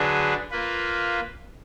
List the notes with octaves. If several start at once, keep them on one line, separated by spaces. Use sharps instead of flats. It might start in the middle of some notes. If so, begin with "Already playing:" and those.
Already playing: D3 F#3 D4 G#4 B4
A#3 F4 B4